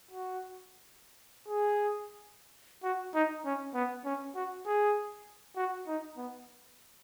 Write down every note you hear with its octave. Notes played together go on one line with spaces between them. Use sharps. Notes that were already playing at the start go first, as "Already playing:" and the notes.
F#4
G#4
F#4
D#4
C#4
B3
C#4
F#4
G#4
F#4
D#4
B3